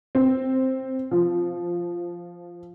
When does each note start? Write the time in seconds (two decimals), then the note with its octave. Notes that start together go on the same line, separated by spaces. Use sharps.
0.15 C4
1.11 F3